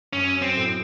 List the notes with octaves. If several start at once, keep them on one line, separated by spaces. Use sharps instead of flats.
F#2 C#4
C4
A2